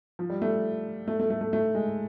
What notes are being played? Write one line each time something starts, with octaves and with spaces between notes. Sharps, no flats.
F3
G3
A3
A3
A3
A3
A3
A3
G#3